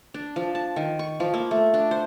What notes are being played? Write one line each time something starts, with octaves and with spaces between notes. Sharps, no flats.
D4
F3
A5
D#3
C#6
F3
A#3
A3
D4
C5